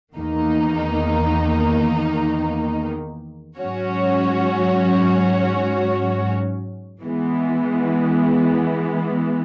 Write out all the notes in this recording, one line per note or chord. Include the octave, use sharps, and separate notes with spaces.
E2 D#3 A#3 D#4
G#2 F#3 C#4 F#4 C#5
E3 G#3 B3